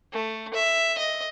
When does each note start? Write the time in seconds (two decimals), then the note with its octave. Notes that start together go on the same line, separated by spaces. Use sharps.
0.13 A3
0.54 E5
0.98 D#5